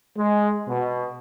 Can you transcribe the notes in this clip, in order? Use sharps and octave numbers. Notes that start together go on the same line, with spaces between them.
G#3
B2